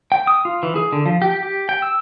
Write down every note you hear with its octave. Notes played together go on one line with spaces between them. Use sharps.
G5
D#6
F4
E3
G#4
D3
F3
G4
G4
G5
E6